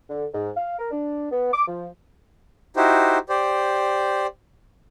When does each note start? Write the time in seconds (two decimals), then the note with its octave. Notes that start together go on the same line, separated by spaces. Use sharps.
0.09 D3
0.33 G#2
0.56 F5
0.79 A#4
0.91 D4
1.31 B3
1.53 D6
1.68 F3
2.77 D#4 E4 F#4 G4 C5
3.29 G4 C5 D5